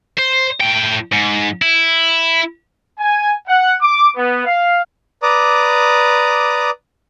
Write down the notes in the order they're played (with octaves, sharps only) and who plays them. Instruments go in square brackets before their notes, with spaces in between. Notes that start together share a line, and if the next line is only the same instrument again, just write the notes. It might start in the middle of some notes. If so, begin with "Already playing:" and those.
[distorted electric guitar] C5
A2 G5
G#2
E4
[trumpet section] G#5
F#5
D6
B3
F5
[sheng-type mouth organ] B4 D5 A#5 D6 D#6